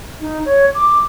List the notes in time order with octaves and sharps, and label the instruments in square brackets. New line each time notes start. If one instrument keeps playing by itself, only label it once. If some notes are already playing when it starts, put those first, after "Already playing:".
[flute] D#4
C#5
D6